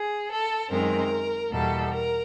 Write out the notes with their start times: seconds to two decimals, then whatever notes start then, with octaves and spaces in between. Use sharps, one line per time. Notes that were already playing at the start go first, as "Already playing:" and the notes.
Already playing: G#4
0.30 A4
0.70 F#2 D#3 G#3 C4 A#4
1.52 E2 B2 G3 A#3 A4
1.93 A#4